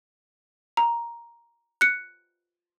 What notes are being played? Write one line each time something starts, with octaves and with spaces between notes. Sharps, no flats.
A#5
F#6 C#7